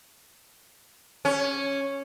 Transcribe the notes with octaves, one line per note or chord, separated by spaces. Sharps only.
C#4